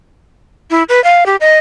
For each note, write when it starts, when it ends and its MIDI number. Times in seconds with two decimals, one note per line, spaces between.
0.70 0.83 64
0.89 1.03 71
1.04 1.24 77
1.26 1.36 67
1.41 1.59 75